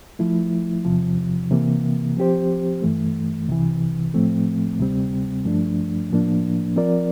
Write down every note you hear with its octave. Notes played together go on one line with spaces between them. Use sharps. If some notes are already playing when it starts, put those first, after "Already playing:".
F3 A3 E4
E2 C3 F3
C3 E3 A#3
F3 C4 G4 C5
G2 E3 A3
C2 C3 E3
A2 F3 A3 C4
D2 C3 G3 C4
G2 F3 A3 D4
A2 F3 A#3 D4
F3 C4 F4 A#4 D5